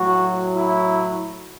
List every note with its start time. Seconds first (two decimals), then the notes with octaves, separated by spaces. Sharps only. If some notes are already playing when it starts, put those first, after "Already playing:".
Already playing: A2 F#3 F#4
0.54 E4